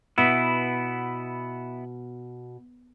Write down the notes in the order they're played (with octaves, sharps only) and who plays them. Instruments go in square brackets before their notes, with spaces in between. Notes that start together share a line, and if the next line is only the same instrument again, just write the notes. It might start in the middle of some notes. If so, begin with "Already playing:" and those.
[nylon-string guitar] B2 [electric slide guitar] B3 E4